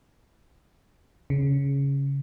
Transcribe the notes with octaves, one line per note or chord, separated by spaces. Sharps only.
C#3